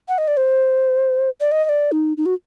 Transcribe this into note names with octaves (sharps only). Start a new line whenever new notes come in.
F#5
D#5
D5
C5
D5
D#5
D#5
D5
D#4
D#4
F#4